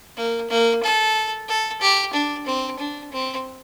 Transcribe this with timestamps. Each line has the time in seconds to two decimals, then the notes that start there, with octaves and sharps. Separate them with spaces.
0.17 A#3
0.50 A#3
0.83 A4
1.48 A4
1.81 G4
2.13 D4
2.46 C4
2.79 D4
3.12 C4